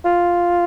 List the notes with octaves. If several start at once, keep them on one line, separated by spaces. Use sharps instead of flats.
F4